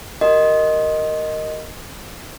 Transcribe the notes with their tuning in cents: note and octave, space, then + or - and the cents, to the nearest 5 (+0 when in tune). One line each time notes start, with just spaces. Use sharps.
G4 -45 A#4 -10 D#5 +0